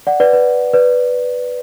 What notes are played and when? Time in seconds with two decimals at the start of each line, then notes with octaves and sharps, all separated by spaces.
0.07 D5 F#5
0.20 B4 D5
0.33 B4
0.73 B4 D5